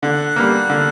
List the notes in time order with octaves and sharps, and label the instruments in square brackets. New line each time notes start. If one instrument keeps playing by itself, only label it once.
[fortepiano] D3 [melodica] F#5
[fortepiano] G3 A#3
D3